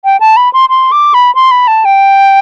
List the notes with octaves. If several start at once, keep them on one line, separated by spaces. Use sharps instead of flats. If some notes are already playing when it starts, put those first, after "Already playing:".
G5
A5
B5
C6
C6
D6
B5
C6
B5
A5
G5